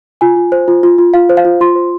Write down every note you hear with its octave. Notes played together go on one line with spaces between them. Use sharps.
F4 G#5
F4
C5
F4
F4
F4
F4 F5
C5
F5
F4
F4 C6
C5